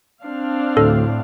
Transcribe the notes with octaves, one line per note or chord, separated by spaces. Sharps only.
C4 D4 F5
D2 A2 A4